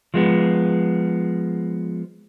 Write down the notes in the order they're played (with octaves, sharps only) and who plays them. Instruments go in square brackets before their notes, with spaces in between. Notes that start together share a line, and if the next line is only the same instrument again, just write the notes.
[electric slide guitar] F3 G#3 B3